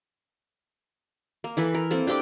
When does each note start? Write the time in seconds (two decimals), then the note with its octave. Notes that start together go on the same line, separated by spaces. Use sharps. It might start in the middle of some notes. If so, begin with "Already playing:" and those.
1.44 A#3
1.57 E3 E4 A4 B4
1.74 A#4
1.91 A#3 C4 A4
2.07 D4 G4 G5 D6